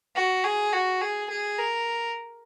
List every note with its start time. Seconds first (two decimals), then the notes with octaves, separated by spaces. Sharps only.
0.16 F#4
0.44 G#4
0.73 F#4
1.01 G#4
1.30 G#4
1.58 A#4